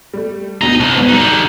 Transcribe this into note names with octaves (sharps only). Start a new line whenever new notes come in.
G3 A3
D2 B2 D#4 A#5
C2 A5 F#6
G#1 B3
D3 F#3 G3 D#4